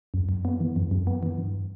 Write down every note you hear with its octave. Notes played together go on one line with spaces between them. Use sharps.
F#2
F#2
B3
E3
F#2
F#2
B3
E3
G2